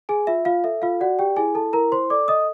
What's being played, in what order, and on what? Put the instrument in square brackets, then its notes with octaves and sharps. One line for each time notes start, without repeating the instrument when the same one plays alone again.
[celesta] G#4 G#5
F4 E5
F4 F5
A4 E5
F4 F5
F#4 D5 F#5
G4 G5
E4 G#4 G#5
A4 A5
E4 A#4 A#5
C5 C6
A4 D5 D6
D#5 D#6